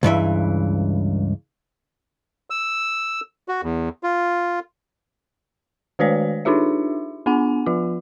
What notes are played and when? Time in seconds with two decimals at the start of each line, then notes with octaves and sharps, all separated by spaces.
0.03 C#2 G2 E3 E5
2.50 E6
3.48 F#4
3.63 E2
4.03 F4
5.99 D#3 G#3 F#4 B4 C#5 D5
6.45 D4 D#4 F4 G4 E5
7.26 B3 D4 F#5 G#5
7.66 F3 F4